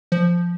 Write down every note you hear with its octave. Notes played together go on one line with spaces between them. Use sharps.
F3